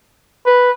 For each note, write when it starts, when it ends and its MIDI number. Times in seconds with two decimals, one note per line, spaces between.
0.46 0.71 71